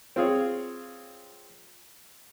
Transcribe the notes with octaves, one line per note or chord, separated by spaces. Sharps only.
C4 F4 G#4 C#5